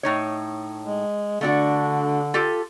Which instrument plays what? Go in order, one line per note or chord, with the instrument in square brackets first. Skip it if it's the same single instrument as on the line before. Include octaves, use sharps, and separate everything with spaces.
[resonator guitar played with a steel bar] A2 D#4 C#5
[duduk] G#3
[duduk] D3 [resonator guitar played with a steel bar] A3 D4 F#4
[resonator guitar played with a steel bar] F4 G4 A4